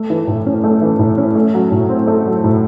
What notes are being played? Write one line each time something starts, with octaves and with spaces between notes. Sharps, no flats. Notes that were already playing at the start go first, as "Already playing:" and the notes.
Already playing: A3
E3
A2
C#4
A3
E3
A2
C#4
A3
F#3
A2
C4
A3
F#3
A2